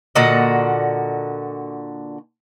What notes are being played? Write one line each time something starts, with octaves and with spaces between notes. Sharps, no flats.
A#2 D3 F#4 D#5